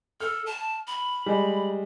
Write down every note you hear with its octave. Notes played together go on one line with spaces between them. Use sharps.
A4 F6
A5
B5
G3 G#3